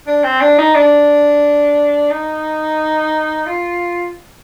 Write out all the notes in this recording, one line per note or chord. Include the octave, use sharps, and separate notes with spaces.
D4
C4
D4
D#4
D4
D#4
F4